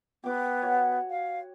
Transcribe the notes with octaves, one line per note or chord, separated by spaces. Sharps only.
B3 G4 D6
F#4 C#5
F5